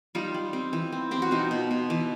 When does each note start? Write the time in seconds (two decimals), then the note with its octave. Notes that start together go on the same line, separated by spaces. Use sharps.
0.15 G3 D#4 F4
0.34 G3
0.53 C4
0.73 E3
0.92 C4
1.11 C4 G4
1.22 F#4
1.31 B2 D#4 F4
1.51 B2
1.71 B2
1.90 E3